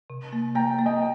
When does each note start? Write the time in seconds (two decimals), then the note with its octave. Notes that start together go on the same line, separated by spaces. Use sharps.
0.10 C3
0.33 A#3
0.55 A#3 G5 A#5
0.79 A#3
0.86 D#5 G5